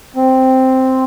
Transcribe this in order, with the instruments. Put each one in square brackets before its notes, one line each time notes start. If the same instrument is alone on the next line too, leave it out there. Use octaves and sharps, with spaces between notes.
[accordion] C4